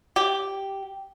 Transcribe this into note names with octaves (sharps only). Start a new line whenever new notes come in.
G4